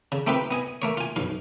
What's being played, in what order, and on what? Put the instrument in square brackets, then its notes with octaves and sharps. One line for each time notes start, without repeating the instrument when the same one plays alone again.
[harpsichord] C#3
A3 C4 D#4 F4 G4 B4
B3 D#5 G#5
A3 A#3 C#5
F4 G#5
B1 F#2 F5